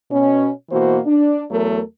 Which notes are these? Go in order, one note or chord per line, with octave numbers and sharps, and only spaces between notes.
B2 C#4
B2 E3 A#3 F#4 C5
D4
E2 F#3 A3 A#4